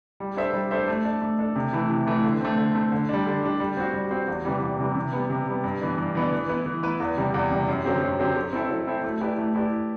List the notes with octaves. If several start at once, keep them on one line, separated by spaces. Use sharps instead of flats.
G3
D4 A4 C5 E5
G3
D4 A4 C5 E5
A3
D4 A4
A3
D4 A4
C3
E3 A3 E4
C3
E3 A3 E4
D3
A3 C4
D3
A3 C4
D3
G3 D4
D3
G3 D4
G3
C4 F#4
G3
C4 F#4
E2
C3 E3 G3
E2
C3 E3 G3
C3
G3 B3
C3
G3 B3
G2
E3 B3 D4
G2
E3 B3 D4
E3
B3 E4 B4
E3
B3 E4 B4
E2
C3 G3
E2
C3 G3
F#2
D3 F#3 C4 G4
F#2
D3 F#3 C4 G4
F#3
C4 E4 A4 E5
F#3
C4 E4 A4 E5
A3
E4 G4 B4 D5
A3
E4 G4 B4 D5